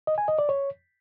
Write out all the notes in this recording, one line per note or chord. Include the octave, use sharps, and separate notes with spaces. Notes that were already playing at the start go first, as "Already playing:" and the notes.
D#5
G#5
D#5
D5
C#5